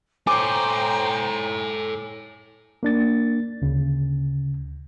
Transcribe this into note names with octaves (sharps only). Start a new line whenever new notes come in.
A4 C5 C#5 G5 G#5 A#5 D6
A#3 D4 A6
D2 C#3